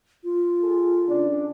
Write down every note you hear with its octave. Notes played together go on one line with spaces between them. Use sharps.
F4
G#4 A4
C#3 C#4 D4